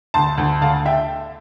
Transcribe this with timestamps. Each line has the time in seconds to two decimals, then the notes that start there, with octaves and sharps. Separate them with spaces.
0.14 D2 A5 C6
0.38 D2
0.62 D3 F5 A5
0.85 E5 G5